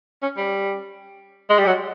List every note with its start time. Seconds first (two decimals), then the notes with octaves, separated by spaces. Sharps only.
0.23 C#4
0.37 G3
1.50 G#3
1.58 G3
1.66 F#3